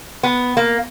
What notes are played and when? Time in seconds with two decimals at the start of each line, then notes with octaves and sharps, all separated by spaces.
0.23 B3
0.57 A#3